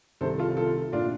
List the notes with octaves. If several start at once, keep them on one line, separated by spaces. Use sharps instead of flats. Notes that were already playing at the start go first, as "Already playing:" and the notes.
C2 C3 D#3 A4 C5
F4 A4
F4 A4
A#2 D4 F4